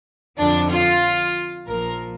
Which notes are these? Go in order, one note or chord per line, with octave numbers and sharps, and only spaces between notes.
F2 D3 F3 D4
F4
A#1 A#2 F3 A#4